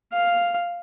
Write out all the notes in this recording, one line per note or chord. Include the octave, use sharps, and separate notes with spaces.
F5